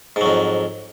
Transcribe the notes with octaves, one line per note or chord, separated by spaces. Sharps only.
F2 G#2 F#3